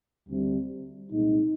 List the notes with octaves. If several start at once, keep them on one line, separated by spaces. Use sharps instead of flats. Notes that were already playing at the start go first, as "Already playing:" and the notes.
D2 C3 G3
C2 A#2 G#3 D#4